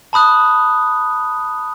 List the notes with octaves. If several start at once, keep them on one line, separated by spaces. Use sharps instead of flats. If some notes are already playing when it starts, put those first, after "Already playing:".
A5 B5 D#6 F#6